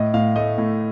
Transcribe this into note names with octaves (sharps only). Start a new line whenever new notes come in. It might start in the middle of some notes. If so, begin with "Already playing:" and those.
Already playing: A2 D#5
A2 F5
A3 D#5
A2